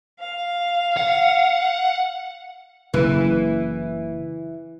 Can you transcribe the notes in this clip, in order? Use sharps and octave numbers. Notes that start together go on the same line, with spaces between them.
F5
F#5
F#1 E3